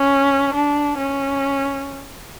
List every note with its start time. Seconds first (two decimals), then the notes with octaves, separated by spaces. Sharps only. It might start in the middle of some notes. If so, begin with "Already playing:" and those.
Already playing: C#4
0.54 D4
0.98 C#4